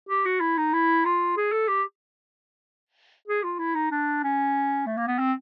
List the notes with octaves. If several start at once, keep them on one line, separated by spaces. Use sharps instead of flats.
G4
F#4
E4
D#4
E4
F4
G#4
A4
G4
G#4
F4
E4
D#4
D4
C#4
A3
A#3
B3
C4